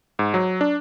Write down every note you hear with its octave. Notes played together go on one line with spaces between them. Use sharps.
G#2
F#3
D4